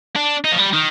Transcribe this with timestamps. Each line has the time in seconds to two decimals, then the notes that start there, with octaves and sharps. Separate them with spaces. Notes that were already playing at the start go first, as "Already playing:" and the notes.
0.16 D4
0.45 D#4
0.52 F3
0.59 G3
0.73 D#3